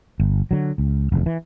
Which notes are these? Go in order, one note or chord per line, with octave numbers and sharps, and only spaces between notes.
G1
D3 F#3
C#2
F1 E2
E3